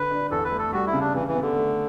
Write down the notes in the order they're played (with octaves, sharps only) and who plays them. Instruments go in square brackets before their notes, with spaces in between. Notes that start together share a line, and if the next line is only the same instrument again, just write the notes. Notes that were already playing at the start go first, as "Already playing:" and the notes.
Already playing: [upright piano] D3 [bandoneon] B4
[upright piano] D4
[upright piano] E2 [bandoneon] A4
[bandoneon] B4
[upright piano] A3
[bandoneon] A4
[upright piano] G3 [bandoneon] F#4
[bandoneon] E4
[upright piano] C#3
[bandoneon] D4
[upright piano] C#3 [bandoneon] E3
[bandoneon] E3
[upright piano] B3
[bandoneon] D3
[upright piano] A3